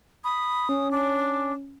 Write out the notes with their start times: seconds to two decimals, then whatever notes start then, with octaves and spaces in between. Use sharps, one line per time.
0.24 B5 D#6
0.69 C#4
0.91 C#4 D4